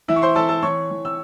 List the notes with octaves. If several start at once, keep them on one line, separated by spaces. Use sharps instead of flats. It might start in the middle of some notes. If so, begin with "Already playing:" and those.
E3 E4 E5
C#6
C5 C6
E3 A4 A5
A4 A5
E3 C#5 C#6
E3
E6